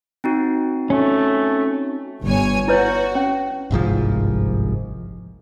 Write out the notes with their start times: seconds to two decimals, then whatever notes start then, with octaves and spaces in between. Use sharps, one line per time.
0.24 C4 D#4 F#4
0.90 A3 C#4
2.24 G1 C#5 G#5
2.68 E4 F#4 B4 C#5
3.15 C#4
3.71 G1 C2 G#2 F3